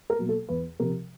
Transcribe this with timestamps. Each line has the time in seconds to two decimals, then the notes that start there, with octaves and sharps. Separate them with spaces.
0.10 A#4
0.19 B2 F#3 A#3
0.29 A4
0.49 E2 B4
0.80 C3 F3 A#4